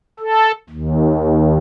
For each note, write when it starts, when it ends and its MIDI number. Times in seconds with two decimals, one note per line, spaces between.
0.19 0.52 69
0.70 1.58 39